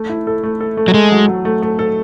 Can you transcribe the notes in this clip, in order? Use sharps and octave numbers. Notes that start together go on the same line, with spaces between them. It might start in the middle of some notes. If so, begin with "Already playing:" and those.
Already playing: A3
E4
A4
A3
A4
A3
F#3
G#3 A3
F#3
F#3
A3
A3
A4